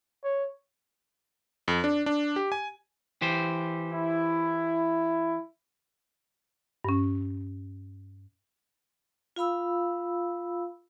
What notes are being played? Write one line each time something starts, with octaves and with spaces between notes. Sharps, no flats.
C#5
F2
D4
D4
G4
G#5
E3 G4 C5
E4
G2 C#4
F4 F5 B5 E6